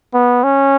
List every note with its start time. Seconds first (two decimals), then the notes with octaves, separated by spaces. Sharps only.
0.14 B3
0.44 C#4